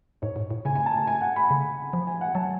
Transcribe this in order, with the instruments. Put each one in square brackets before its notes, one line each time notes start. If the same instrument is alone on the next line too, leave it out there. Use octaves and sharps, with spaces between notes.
[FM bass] G#2 [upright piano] C#5
[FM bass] G#2
A2
[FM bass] C#3 [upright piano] G#5
[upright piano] G#5
A5
A5
G#5
F#5
B5
[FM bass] C#3
F3
[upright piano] G#5
F#5
[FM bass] F#3 [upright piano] A5